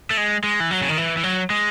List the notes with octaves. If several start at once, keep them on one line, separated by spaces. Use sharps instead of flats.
A3
G#3
G#3
E3
F#3
C#3
D#3
E3
E3
F#3
G#3